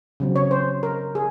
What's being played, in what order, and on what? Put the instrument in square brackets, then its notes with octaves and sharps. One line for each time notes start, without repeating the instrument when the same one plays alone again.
[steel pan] C#3 F#3 C4
C#5
C5
A#4
G#4